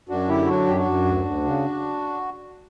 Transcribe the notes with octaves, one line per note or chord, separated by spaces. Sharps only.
F#2 D4 F#4
D3 E4 G4
F#3 D4 F#4
F#2 G4
D4 F#4
F#2
D2
D2
C#3